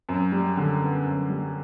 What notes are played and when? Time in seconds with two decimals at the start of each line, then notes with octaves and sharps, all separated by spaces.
0.09 F#2
0.32 G3
0.57 D3
0.81 B3
1.05 F#2
1.30 G3